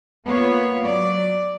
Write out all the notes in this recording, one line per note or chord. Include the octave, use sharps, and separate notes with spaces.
A#3 B3 F4 C#5
F#3 D5